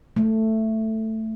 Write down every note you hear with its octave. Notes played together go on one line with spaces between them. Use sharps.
A3